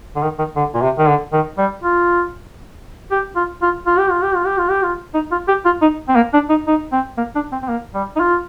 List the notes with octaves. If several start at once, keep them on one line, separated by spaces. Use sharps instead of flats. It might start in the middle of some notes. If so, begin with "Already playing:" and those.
D3
D#3
D#3
D3
A#2
C3
D#3
D3
D#3
G3
F4
G4
F4
F4
F4
G4
F4
G4
F4
G4
F4
G4
F4
D#4
F4
G4
F4
D#4
C4
A#3
D4
D#4
D#4
C4
A#3
D4
C4
C4
A#3
G3
D#4
F4